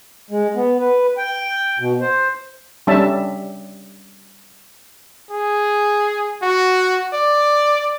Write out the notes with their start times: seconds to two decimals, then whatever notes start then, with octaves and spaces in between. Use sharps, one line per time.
0.30 G#3
0.55 B3
0.80 B4
1.18 G5
1.79 B2
2.01 C5
2.87 G3 C#4 D4 E5 A5
5.31 G#4
6.42 F#4
7.14 D5